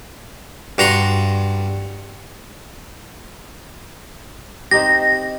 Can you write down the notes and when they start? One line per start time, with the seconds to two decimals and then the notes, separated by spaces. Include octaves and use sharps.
0.78 G2 F#4 A#5 C6
4.71 C4 D#4 G4 A#6